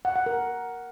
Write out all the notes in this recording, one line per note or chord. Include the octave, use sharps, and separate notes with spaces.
F#5
F#5
A#4